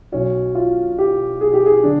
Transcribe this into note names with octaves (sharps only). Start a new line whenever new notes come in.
B1 B2 F#3 C#4
F4
G4
G#4
G4
G#4
D3 D4